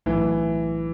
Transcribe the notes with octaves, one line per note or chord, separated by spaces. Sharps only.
B1 A2 E3 F#3 A3